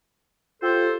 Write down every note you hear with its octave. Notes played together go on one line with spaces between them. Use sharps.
F4 G4 A4 C5